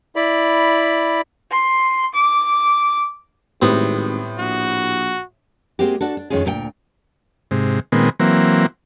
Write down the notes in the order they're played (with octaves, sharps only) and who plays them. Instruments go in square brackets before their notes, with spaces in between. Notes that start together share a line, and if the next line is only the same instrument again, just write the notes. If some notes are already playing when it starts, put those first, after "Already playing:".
[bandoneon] E4 D5 B5
[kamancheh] C6
D6
[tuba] G#1 [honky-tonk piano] A2 G3 [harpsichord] B3 C4
[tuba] A#1 [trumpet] F#4
[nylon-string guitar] G#3 A#3 C4 F#4 G4
D4 F#4 A4
D4
F2 D#3 G#3 C#4 F4 G#4
D2 A#2 G#4 G5
[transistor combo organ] G#2 C3
A#2 D#3 G#3 B3 C4
E3 F#3 A#3 C4